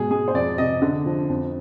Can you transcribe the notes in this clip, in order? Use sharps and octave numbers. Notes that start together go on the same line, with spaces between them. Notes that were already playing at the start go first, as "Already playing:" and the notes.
Already playing: G#2 B2 G#4
G#3 G#4
C5
F2 D5
C3 D#5
D3
F3
F2